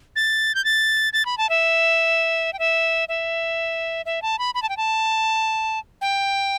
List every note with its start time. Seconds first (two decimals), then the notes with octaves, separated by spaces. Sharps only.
0.16 A6
0.55 G6
0.65 A6
1.13 A6
1.26 B5
1.38 A5
1.49 E5
2.53 G5
2.59 E5
3.09 E5
4.06 E5
4.22 A5
4.39 B5
4.55 B5
4.62 A5
4.69 G5
4.77 A5
6.01 G5